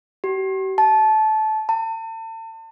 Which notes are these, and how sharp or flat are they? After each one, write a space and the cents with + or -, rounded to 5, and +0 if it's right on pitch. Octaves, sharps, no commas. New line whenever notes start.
G4 -45
A5 -20
A5 +40